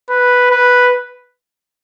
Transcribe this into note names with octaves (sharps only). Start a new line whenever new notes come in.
B4
B4